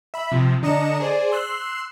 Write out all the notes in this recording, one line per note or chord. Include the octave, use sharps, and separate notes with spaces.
E5 B5
C3 F3
D3 D4 D#5 A#5 C#7 E7
G#4 C5 D5
C6 E6 F#6 C7